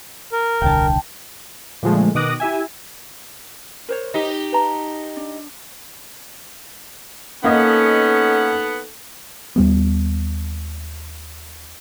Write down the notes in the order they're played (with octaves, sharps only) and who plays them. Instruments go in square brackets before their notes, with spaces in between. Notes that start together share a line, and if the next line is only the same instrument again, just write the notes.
[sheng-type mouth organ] A#4
[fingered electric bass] D#1 C2 D3 [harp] G5 A5
[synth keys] A#2 D3 F3 G#3 A3
B2 D#3 D6 D#6 F#6 A#6
E4 G4 E5 G#5
[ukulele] A#4 C5 C#5
[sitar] D#4 G4
[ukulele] B4 A5 A#5
D4
[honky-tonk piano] A#3 D#5 [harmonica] B3 F#5 [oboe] C#4 [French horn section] D#4 A4
[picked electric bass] D#2 G3 B3